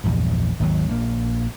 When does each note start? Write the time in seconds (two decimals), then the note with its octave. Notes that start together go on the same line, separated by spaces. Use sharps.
0.04 A#1 E2 G2
0.60 G#1 D#2 F#3
0.88 A#1 A#3